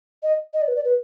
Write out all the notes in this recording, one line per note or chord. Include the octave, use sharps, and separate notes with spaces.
D#5
D#5
D5
B4
D5
B4